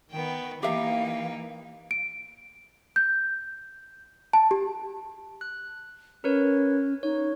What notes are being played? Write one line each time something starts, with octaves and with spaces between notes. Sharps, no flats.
D#3 B3 G5
E3 A#3 D#4 G4 E5 F5 G5
D7
G6
A5
G4
F#6
C#4 A#4 B4 C#5
D#4 C#5